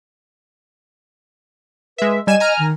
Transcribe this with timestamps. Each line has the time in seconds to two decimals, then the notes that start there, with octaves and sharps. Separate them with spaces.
1.98 G#3 B4 E5
2.27 G3 D#5 G#5 E7
2.40 G#5 A#5 F6
2.59 D#3